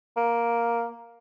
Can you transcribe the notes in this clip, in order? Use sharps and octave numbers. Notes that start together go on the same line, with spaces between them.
A#3